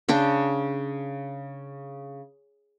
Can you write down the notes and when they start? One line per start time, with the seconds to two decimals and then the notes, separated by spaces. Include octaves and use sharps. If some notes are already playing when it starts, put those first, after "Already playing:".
0.09 C#3 D4 G5